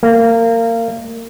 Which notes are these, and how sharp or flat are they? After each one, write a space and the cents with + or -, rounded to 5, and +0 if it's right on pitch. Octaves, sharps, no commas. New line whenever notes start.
A#3 -25